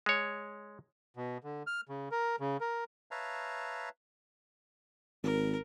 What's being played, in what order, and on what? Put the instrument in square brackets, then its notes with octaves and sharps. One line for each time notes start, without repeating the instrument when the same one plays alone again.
[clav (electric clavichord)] G#3 C#5
[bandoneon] B2
D3
F6
C#3
A#4
C#3
A#4
[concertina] B4 C#5 E5 F5 A5 A#5
[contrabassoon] G#1 [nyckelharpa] A#4